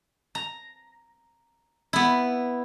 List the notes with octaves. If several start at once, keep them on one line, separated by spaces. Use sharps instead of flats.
A#5
B3 E4